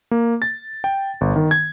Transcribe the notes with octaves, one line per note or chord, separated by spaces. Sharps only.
A#3
A6
G5
G1
D#3
G#6